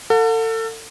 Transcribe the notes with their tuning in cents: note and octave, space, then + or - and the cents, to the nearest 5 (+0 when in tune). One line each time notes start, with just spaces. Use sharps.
A4 +35 F#5 -35